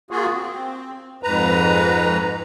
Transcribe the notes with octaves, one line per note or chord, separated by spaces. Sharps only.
A#3 F4 F#4 G#4
C4
F2 G#2 B4 A#5